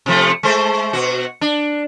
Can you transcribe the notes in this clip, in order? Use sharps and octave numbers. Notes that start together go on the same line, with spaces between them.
C3 F3 A3
G#3 A3 C5
B2 F#4
D4